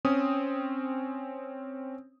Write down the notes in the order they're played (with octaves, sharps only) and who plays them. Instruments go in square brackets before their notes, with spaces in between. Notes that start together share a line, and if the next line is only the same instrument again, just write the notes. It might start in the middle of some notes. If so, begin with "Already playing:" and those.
[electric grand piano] C4 C#4 D#6